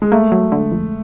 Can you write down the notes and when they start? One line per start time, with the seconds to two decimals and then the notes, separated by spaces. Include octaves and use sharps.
0.02 G#3
0.12 A3 A#3
0.32 F#3
0.52 D3
0.71 F2